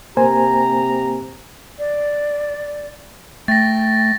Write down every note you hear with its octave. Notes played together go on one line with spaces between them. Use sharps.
C3 A#3 G4 C5 G#5 A#5
D5
A3 G5 A6 A#6